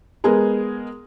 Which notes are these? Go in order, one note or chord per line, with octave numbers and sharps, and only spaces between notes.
G#3 B3 G#4 A#4